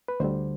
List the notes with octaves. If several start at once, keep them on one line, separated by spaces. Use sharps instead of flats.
B4
D2 D3 G3 C5